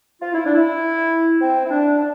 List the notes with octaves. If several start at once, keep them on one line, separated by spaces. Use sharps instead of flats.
F4
E4
D4
E4
C4
E4
D4
D4